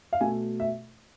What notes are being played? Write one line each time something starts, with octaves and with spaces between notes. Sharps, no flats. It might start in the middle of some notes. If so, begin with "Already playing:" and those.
F5
B2 A3 G#5
E5